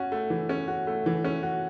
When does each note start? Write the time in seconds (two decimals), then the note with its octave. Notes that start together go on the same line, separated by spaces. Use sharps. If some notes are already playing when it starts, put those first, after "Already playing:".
Already playing: C#4 F#4
0.12 A3
0.30 E3
0.49 C#4
0.68 F#4
0.87 A3
1.06 E3
1.24 C#4
1.43 F#4